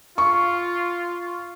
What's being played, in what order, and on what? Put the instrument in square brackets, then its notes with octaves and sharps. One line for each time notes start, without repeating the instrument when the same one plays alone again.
[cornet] F4 [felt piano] C#6